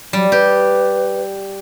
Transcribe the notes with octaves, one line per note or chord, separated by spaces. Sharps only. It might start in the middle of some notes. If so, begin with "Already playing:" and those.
F#3 G3
G4 B4